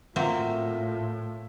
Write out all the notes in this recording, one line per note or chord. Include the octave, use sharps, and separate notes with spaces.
A2 F#3 A#3 C4 F4 E5